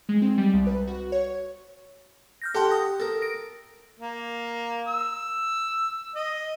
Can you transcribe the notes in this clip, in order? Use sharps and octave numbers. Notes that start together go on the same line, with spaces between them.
G#3
C4
G3
C2
B4
F#4
C#5
F6 G6 A#6
G4 A4 F#5 A5 C6
D#6 A#6
A4 A#4
A#6 D7
A#3
E6
D#5